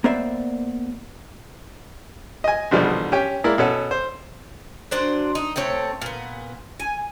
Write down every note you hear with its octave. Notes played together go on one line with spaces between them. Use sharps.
A#3 B3 C5 D5 E5
D#5 G#5
A#1 E2 B2 D3 F3 G3
C#4 G4 G5
G#3 A#3 E4 A#4 D5
B2 C#4 A4 F#5
C5
F#3 D4 C5 D5
D#4
C3 A3 C4 C#5
A#2 B3
G#5